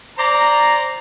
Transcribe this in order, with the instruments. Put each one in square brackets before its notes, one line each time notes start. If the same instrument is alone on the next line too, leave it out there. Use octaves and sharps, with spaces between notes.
[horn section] C5 D5 A#5